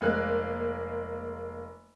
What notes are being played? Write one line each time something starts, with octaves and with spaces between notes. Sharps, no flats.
F1 G#3 A#3 F#6